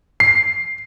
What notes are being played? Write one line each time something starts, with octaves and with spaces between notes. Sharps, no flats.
C7